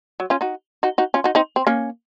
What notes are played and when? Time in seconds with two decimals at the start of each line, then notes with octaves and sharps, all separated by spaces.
0.20 F#3
0.30 C#4 F4
0.41 D#4 F#4
0.83 D#4 F#4
0.98 D#4 F#4
1.14 C#4 F4
1.24 D#4 F#4
1.35 C4 D#4
1.56 C4
1.67 A#3 C#4